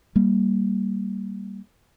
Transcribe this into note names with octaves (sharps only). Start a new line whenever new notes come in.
G3 A#3